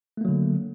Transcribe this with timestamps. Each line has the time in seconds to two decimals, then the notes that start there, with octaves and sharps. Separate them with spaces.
0.17 A3
0.21 A#3
0.25 F#3
0.28 D3